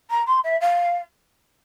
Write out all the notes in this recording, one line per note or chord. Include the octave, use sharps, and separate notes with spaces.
A#5
C6
E5
F5